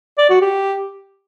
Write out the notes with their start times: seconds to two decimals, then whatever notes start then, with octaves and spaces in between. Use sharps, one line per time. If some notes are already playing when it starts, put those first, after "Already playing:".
0.18 D5
0.30 F#4
0.41 G4